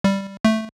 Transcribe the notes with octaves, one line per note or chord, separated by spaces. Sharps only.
G3
A3